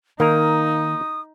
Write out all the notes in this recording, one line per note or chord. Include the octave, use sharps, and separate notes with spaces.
D#3 A#3 D#4 A#4 D#6